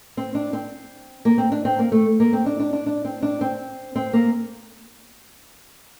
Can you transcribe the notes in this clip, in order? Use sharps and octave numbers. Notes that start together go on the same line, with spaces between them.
C4
D4
C4
A#3
C4
D4
C4
A#3
A3
A#3
C4
D4
D4
D4
D4
C4
D4
C4
C4
A#3